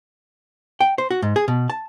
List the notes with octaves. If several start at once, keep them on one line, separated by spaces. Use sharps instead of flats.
G5
C5
F#4
G#2
G#4
B2
A5